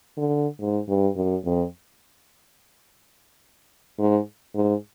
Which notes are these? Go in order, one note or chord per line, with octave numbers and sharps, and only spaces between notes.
D3
G#2
G2
F#2
F2
G#2
G#2